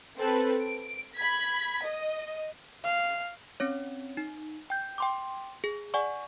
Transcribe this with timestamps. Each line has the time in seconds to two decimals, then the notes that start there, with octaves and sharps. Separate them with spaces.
0.16 C4 A4 B4
0.62 D7
1.15 B5 G#6 B6
1.82 D#5
2.84 F5
3.60 C4 C#4 C#5
4.17 D#4
4.70 G5 G6
4.98 G5 C6 D6
5.64 G#4
5.94 D5 F#5 G#5 C#6